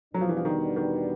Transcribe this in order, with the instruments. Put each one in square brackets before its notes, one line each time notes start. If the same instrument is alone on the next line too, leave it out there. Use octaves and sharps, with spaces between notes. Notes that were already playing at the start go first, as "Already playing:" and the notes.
[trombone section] E2 B2 G3 B3 D4 [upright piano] F#3
[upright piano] F3
E3
F3
D#3
D#3